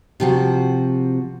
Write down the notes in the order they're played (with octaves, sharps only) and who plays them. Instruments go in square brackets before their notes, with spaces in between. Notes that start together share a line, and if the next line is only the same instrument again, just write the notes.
[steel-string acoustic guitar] C3 F3 F#4